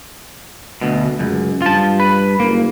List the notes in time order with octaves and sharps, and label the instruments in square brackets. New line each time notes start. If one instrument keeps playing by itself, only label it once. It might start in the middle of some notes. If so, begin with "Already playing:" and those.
[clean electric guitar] D2 B2
C#2 F#2
[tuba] G2 [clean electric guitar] F4 A5
[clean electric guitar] B4
[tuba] F#1 [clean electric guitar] A#3